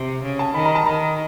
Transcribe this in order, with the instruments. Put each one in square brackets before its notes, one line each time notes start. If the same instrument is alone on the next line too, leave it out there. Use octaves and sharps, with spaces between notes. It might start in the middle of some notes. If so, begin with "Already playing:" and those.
Already playing: [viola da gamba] C3
C#3
[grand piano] A5
[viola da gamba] D#3 [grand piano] B5
[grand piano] A#5
A5
[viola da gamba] D#3 [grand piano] A#5